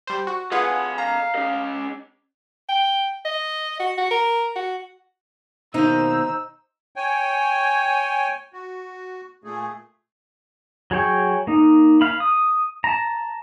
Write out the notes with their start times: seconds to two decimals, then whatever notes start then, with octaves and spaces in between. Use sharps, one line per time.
0.07 G3 C5
0.27 F#4
0.51 F4 G#4 A4 B4 D#5 F#5
0.98 F5 A#5
1.35 C#4 D#5
2.69 G5
3.25 D#5
3.80 F#4
3.98 F#4
4.11 A#4
4.56 F#4
5.74 B2 D#3 A#3 D#4 C5 E6
6.95 C#5 G5 G#5
8.53 F#4
9.44 A#2 A3 G#4
10.91 F#3 G#4 C#5 G5
11.47 A#3 D#4
12.01 F5 B5
12.20 D#6
12.84 A5 A#5